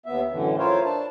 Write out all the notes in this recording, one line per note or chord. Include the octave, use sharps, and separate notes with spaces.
D#2 B3 E5
F#2 A2 D3 E3
E4 F4 A#4 C5 C#5 F5
D4 A5